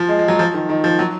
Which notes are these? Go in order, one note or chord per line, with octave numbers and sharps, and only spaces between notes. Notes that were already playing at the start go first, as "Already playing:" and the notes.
Already playing: F3
G#3
G#3
F#3
F3
D#3
D#3
F3
F#3